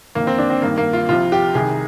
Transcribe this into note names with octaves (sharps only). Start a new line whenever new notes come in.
G1 F2 D#3 A#3
C4
D4
C4
G#1 G2 D#3 A#3
A#3
F4
C2 C3 F3 F4
G4
C2 C3 D#3 G#4